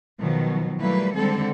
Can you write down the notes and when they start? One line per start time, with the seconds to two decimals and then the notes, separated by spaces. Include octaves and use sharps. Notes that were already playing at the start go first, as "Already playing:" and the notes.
0.20 B2 D#3 F3 F#3
0.79 F#3 G3 A3 A#3 E4 B4
1.15 D3 D#3 G3 G#3 C4 A4